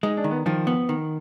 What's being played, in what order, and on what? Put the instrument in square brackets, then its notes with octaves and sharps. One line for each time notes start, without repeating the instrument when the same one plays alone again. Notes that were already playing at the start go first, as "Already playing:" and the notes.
[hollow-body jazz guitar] G#3 [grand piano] D#4
[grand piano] D4
[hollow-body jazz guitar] D#3
[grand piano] B3
[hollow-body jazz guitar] D#3 [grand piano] F3
[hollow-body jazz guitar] B3
D#3